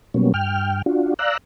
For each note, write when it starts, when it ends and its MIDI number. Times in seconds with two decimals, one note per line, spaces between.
0.14 0.32 47
0.14 0.32 54
0.14 0.32 55
0.14 0.32 58
0.14 0.32 59
0.14 0.32 61
0.34 0.82 43
0.34 0.82 79
0.34 0.82 89
0.86 1.14 62
0.86 1.14 65
0.86 1.14 66
1.19 1.37 74
1.19 1.37 77
1.19 1.37 82
1.19 1.37 88
1.19 1.37 90